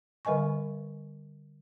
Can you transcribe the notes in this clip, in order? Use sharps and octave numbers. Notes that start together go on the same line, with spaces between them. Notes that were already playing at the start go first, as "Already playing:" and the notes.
D3 G3 B4 D#5 G#5 C#6